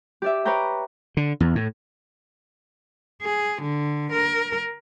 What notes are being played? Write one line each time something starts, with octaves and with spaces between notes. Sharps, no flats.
G4 D5 E5
B4 C#5 D5 G5 A#5
D3
E2
A2
G#4
D3
A#4